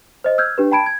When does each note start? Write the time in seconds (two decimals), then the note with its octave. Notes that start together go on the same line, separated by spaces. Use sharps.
0.24 C5 D#5
0.38 E6 F6 G6 G#6
0.58 D4 G4 B4
0.72 G5 A5 B5 G#6 D7
0.86 G#6